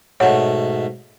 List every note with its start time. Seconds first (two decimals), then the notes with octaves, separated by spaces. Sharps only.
0.20 G#2 B2 A3 C#5 F#5